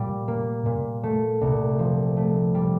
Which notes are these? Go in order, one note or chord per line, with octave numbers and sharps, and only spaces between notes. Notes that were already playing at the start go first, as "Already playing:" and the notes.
Already playing: A#2 G3
A#3
A#2
A3
C2
F3
A3
G3